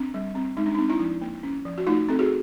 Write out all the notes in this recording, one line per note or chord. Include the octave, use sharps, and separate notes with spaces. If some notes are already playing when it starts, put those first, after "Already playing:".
Already playing: C4 D4
G3
C4
G#3 D#4
D4
C4 D#4
D4 E4
F3
A#3
C#4
F3
F#4
A3 D#4 F4
C4 A4
F#4 G#4